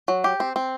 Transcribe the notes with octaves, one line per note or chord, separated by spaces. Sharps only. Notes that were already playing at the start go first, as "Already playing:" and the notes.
F#3
G4
C4
C4